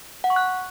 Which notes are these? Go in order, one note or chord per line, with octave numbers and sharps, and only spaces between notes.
F#5
C#6
F#6